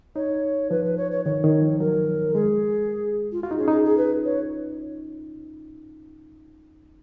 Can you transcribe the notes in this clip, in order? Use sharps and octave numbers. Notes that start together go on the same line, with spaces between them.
D#4 C#5
F3 B4
B4
C#5
C#5
D#3 C#5
D#3
F3
F#3 A#4
G#3 G#4
F4
F4 F#4
D#4
C#4 G#4
D#4 G#4
G#4
B4
C#5